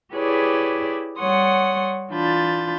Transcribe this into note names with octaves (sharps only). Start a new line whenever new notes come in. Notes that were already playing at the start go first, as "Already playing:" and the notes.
E4 G4 G#4 B4 C#5 D5
G3 C#5 F#5 C6 D#6
E3 D4 F4 B5 G6 A6